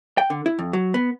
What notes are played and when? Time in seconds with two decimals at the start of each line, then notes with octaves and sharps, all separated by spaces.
0.18 G5
0.30 D3
0.46 E4
0.59 F2
0.73 F#3
0.94 B3